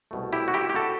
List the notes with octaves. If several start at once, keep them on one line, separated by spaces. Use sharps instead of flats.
C2 B2 A3
E4 G4
F#4
E4 G4
G4
F#4 A4